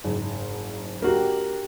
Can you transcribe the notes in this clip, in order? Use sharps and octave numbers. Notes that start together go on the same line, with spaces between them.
F#1 G#2
A#3 D4 F#4 G4